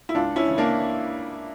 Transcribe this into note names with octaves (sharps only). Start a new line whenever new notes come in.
E4
C#2 D4 F4
C#4 E4
C#3 E3
A#3 D4